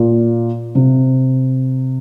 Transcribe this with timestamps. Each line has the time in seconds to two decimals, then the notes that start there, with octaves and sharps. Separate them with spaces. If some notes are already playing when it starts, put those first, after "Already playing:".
Already playing: A#2
0.75 C3